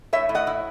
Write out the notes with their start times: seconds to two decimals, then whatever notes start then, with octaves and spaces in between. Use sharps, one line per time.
0.13 A2 C#5 E5
0.29 A2
0.35 D#5 F#5
0.47 E4